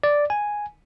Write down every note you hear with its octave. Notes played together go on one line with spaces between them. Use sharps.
D5
G#5